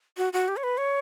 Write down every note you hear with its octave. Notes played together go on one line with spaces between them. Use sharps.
F#4
F#4
G4
C#5
B4
C#5